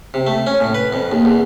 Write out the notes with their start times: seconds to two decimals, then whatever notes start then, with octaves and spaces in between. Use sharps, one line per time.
0.14 C3
0.27 A3
0.46 C#4
0.60 A2
0.74 B4
0.93 F2
1.12 D#2
1.25 E2